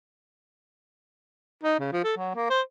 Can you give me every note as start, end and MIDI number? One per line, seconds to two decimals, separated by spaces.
1.63 1.77 63
1.79 1.88 49
1.92 2.03 53
2.04 2.14 69
2.17 2.31 54
2.35 2.47 58
2.50 2.61 72